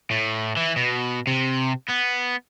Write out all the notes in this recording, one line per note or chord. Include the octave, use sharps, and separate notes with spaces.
A2
E3
B2
C3
B3